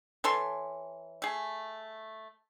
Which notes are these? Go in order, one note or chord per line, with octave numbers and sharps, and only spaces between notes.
E3 A4 C#5 C6
A3 G#4